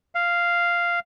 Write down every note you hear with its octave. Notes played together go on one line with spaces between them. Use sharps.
F5